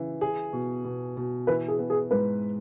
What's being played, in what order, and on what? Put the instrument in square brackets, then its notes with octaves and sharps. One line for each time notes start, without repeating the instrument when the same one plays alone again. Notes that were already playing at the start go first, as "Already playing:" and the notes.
Already playing: [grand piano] C#3 E3
G#4
B2
B2
B2
[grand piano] E3 [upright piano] B4
[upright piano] G#4
[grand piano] B3
[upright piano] G#4
[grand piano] G#2 [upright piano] B4